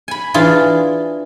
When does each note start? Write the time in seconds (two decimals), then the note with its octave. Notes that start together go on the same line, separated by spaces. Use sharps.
0.08 G#5 B5
0.34 E3 D4 F4 G#4